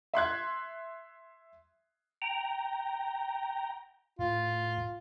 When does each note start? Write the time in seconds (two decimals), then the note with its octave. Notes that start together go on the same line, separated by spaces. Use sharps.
0.13 E5 C6 F#6 G#6
2.22 G5 A#5
4.19 A2 F4